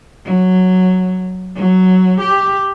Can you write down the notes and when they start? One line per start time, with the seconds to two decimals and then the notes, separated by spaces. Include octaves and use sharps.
0.25 F#3
1.55 F#3
2.20 G4